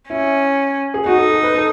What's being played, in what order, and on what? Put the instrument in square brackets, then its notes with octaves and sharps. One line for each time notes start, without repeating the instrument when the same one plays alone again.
[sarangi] C#4 [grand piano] E4
[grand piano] G#4
[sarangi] D#4 [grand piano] F#4
[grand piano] A4
A4
B4
A4